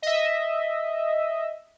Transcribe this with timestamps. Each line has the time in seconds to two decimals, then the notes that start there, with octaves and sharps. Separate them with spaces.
0.02 D#5 E5